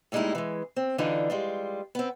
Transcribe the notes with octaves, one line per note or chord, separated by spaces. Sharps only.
A2 G3 G#3 A#3 D#4 E4
E3 G#3
C4
D3 E3 D4 D#4 F4
G3 G#3 F4
B3 C4